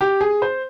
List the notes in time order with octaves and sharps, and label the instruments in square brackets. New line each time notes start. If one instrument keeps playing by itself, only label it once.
[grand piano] G4
G#4
C5